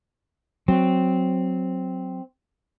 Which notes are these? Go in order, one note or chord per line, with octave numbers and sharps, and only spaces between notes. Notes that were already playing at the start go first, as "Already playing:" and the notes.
F#3 C4